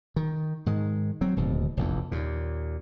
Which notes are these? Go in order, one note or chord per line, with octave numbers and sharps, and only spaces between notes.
D#3
G#2 D#3 G#3
F#3 C4
D1 D#2 B2
F1 A#1 E2
D#2 A#2